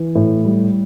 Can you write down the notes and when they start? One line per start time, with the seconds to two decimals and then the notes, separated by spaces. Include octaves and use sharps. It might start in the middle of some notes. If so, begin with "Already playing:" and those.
Already playing: E3
0.15 A2
0.45 G3